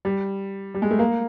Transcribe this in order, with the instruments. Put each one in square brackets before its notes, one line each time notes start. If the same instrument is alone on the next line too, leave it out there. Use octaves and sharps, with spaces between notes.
[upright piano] G3
G3
G#3
A3
A#3